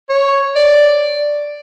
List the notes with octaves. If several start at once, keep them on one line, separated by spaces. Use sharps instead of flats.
C#5
D5